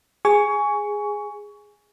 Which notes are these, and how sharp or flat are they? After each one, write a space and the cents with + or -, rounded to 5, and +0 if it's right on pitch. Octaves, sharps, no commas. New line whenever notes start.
G#4 -5 G#5 +0 C#6 +20